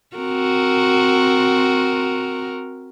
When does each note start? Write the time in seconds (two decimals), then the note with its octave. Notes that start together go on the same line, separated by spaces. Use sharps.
0.16 C4 F#4 A#4